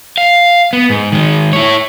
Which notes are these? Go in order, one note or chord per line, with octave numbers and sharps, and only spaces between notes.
F5
B3
G#2
D#3 G#3
E4 C#5